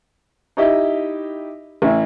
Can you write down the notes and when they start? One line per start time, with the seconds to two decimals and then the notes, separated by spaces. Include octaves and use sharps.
0.57 D#4 E4 G4 D#5 E5
1.82 A1 E4